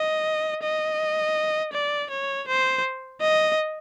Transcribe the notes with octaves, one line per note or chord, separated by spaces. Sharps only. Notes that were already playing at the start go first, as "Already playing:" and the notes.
Already playing: D#5
D#5
D5
C#5
C5
D#5